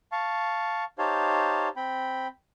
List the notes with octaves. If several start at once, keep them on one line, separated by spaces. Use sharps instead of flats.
F5 A5 C#6
D#4 G4 C5 C#5 F5 A5
C4 G5 B5